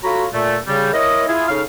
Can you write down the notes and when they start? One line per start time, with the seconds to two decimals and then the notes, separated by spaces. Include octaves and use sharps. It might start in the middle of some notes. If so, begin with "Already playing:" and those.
0.04 F4 F#4 A4 C#5 A#5 B5
0.33 A#2 A3
0.67 C#3 G3
0.93 E4 A#4 C#5 D#5
1.28 E4 F4 G#4
1.48 C#3 D#4 A4 F5